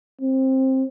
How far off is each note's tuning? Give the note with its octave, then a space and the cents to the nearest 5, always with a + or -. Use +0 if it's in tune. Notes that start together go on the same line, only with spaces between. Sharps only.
C4 +15